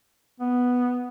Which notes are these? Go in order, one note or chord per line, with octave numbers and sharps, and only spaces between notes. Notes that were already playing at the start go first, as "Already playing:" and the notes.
B3